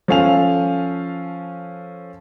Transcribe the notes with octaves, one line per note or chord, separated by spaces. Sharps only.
F3 C#4 A4 F5 G#5 F7